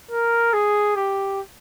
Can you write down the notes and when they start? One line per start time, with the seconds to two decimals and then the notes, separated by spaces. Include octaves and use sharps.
0.11 A#4
0.53 G#4
0.96 G4